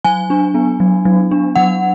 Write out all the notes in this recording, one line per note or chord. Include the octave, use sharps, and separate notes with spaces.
F#3 G#5
D4
B3
F#3
F#3
D4
F#3 F#5